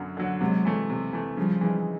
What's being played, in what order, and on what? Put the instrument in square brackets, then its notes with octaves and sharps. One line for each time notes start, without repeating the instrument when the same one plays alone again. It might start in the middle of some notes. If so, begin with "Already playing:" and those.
Already playing: [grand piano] F#2 D3 F#3
D3 F#3
[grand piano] C3 [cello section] F#3 G#3
[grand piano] E3 A3
C3
E3 A3
[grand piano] C#3 [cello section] F3 G3
[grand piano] E3 G#3 C4 D#4